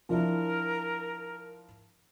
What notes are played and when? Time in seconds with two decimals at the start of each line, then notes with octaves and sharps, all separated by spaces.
0.09 F3 D4 E4 A#4